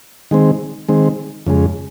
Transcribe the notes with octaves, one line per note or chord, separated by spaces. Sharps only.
D#3 G#3 C4
D#3 G#3 C4
F2 C#3 G#3